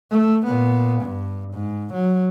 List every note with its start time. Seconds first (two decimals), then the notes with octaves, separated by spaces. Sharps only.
0.11 A3
0.46 A#2 B3
1.02 G2
1.54 G#2
1.93 F#3